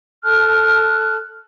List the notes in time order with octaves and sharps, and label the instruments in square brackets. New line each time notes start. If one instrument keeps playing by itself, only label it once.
[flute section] A4 A5 F6 F#6